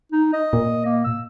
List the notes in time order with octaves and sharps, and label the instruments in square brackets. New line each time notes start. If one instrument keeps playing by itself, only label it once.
[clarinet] D#4
D#5
[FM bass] A#2
[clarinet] A#3
E6